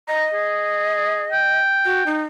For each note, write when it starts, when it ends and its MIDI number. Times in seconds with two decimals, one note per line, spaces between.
0.08 1.58 75
0.08 0.25 82
0.34 1.26 68
1.32 2.21 79
1.85 2.03 66
2.06 2.22 63